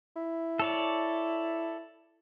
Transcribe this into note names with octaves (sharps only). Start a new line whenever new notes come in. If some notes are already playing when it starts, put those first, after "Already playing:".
E4
A4 C#5 D5